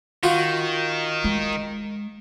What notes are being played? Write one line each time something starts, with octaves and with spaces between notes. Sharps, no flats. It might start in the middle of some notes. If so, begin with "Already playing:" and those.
D#3 F4 F#4
G#3